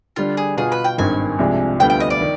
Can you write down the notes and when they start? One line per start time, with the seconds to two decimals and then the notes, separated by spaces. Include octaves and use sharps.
0.16 D3 G3 D4 F4
0.37 G#4
0.57 B2 B3 F4 G#4
0.72 B4
0.84 G5
0.98 G#1 G2 D#3 G#5
1.39 C2 C3 F3 G#3 D4
1.79 D2 D3 G3 B3 F4 G5
1.90 G5
2.00 D#5
2.10 D5
2.21 D#3